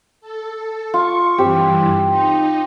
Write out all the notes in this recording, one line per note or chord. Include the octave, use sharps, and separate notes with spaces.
A4
F4 C#6
G2 E3 C4 G4
D#4